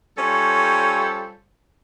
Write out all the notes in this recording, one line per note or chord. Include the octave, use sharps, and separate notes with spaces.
G3 C#4 F4 A4 C5 C#5